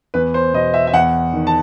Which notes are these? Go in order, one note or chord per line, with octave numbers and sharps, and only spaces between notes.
E2 B4
C5
B2 D#5
E5
E5
E2 F#5
D#3
A5